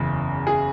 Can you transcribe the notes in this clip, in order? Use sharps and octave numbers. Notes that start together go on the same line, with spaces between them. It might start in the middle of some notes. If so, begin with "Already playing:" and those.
Already playing: F#1 E2 C#3
G#4